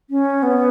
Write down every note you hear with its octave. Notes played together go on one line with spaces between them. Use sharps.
C#4
B3